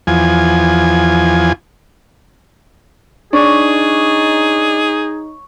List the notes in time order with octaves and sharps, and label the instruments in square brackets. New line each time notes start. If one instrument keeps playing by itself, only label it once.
[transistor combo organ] E2 F3 G#5
[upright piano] D4 [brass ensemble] D#4 [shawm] G#4 [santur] C#5